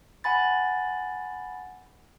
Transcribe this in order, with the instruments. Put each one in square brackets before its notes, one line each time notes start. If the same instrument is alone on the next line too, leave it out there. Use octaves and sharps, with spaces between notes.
[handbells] F#5 G#5 B5 A6